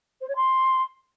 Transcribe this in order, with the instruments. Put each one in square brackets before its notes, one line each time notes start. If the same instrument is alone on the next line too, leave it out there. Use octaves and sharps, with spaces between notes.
[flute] C5
C#5
C6